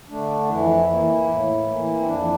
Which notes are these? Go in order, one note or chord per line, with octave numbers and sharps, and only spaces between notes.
D3 A3 D4
F2 E3 E4
E3 A#3
A2
E3 A#3
C4
F2 D4